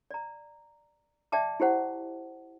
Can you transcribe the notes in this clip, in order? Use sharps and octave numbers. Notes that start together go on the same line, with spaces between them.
D5 A#5
D5 E5 G5 A5 D6
E4 G4 C5 F#5